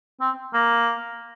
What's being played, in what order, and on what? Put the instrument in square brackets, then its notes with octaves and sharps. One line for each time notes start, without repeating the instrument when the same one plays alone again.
[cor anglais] C4
A#3